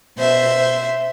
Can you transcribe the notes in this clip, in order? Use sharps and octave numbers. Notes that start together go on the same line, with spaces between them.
B2 C5 E5